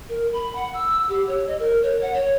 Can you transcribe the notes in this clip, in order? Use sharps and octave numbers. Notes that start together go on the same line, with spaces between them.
A#4
B5
F#5
E6
G4
C#5
D#5
A#4
C#5
F#5
C#5